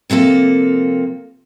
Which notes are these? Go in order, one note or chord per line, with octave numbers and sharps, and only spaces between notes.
C3 F3 A#3 A4